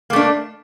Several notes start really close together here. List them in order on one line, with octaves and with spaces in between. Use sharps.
A#3 A3 D4